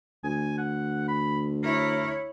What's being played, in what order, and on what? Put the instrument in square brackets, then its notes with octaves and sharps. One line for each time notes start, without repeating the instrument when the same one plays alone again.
[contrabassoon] D2 [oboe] G#5
[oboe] F#5
B5
[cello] E4 C#5 [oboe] A#4